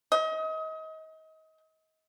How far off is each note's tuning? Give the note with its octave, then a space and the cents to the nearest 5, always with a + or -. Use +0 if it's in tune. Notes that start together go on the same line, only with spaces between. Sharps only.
D#5 +30